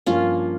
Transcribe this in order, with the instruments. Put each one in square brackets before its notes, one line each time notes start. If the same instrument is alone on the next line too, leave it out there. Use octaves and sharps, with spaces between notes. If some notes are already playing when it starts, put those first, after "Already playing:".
[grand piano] G2 F3 A#3 [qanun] C#4 F4